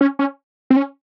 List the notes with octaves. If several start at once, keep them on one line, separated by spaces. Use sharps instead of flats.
C#4
C#4
C4
C#4